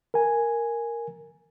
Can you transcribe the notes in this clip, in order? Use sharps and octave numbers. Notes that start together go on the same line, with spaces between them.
A#4 G#5